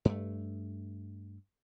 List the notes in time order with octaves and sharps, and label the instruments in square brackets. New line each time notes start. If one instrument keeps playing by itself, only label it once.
[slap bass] G2 A3